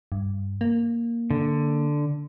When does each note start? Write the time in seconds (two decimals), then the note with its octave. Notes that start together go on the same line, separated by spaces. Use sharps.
0.12 G2
0.61 A#3
1.31 D3